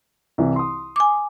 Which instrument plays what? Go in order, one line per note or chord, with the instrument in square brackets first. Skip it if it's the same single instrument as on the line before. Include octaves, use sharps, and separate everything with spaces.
[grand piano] C2 E3
C6 D#6
[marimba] G#5 D6